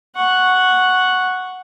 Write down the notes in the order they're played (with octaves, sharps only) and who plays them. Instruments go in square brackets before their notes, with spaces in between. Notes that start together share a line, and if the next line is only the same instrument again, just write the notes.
[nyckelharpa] F#5 C#6